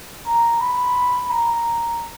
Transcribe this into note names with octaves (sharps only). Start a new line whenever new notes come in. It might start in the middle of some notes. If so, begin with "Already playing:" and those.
A#5
B5
A#5